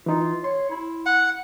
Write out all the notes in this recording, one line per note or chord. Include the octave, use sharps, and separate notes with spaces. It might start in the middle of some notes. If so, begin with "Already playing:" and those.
E3 D#4 F4
C#5 C6
E4
F#5